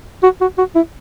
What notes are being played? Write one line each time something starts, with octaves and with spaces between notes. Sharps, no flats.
F#4
F#4
F#4
E4